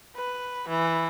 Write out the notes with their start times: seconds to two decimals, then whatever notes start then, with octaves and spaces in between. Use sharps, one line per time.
0.16 B4
0.69 E3